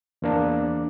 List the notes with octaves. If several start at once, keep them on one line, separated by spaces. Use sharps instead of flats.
E2 A#3 D4